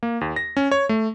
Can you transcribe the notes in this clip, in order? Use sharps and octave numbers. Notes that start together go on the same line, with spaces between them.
A#3
D#2
A#6
C#4
C#5
A3